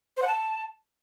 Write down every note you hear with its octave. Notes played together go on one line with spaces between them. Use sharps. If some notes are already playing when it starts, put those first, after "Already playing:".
C5
F#5
A5